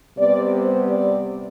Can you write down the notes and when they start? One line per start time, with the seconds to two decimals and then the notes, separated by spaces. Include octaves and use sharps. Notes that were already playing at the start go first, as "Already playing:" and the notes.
0.17 C3 G3 B3 D5
0.53 C5
0.89 D5